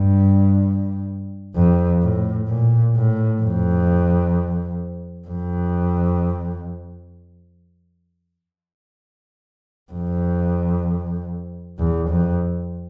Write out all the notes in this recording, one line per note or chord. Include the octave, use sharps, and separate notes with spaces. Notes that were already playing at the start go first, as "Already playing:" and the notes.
Already playing: G2
F2
A2
A#2
A2
F2
F2
F2
E2
F2